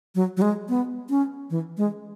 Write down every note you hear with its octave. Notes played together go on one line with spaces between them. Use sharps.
F#3
F#3
G#3
B3
C#4
E3
G#3